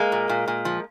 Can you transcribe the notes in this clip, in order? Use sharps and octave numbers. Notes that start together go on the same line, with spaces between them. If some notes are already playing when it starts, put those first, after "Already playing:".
Already playing: G#3 A#3
A#2
A#2
A#2
F3